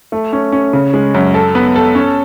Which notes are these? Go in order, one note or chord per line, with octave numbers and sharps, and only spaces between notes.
A3
C#4
C#4
C#3
G#3
F#2
A4
B3
A4
C#4